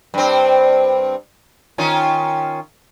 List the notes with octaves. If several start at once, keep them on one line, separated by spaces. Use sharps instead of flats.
G2 C4
D#3 C#4 F4